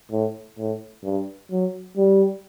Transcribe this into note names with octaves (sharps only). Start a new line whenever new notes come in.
A2
A2
G2
F#3
G3